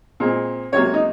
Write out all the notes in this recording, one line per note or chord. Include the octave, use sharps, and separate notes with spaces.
A#2 G#3 C4
C#2 C3 F#3 A#3 C#5
D#4